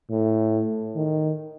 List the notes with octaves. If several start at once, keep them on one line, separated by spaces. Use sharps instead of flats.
A2
D#3